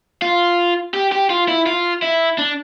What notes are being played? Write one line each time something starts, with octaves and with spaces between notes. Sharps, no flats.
F4
G4
G4
F4
E4
F4
E4
D4